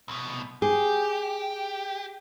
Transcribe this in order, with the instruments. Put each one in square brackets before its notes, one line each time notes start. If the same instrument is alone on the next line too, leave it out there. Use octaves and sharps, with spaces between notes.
[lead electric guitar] C2 B2
[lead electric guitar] G4 [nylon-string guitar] G#4